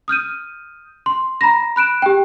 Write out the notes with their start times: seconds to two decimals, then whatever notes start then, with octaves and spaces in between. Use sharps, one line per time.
0.08 D#6 F6 G6 D#7
1.06 C6
1.41 A#5 B5 A#6
1.76 B5 F#6 D7 E7
2.02 G4 G5